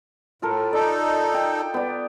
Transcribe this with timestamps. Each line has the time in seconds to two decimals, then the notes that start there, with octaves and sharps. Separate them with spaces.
0.42 A2 F4 A4 A#4
0.73 D#4 A4 D5
1.34 G5
1.74 B3 D5